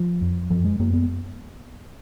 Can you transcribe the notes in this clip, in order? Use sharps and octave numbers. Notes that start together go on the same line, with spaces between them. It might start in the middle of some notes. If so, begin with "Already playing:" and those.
Already playing: F3
F2
F#2 F3
G#3
F#2 A#3
B3